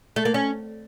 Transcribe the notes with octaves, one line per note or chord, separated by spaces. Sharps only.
A3
A#3
C#4